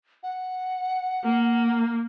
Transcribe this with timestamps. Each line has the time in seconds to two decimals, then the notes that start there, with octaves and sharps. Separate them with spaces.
0.23 F#5
1.24 A#3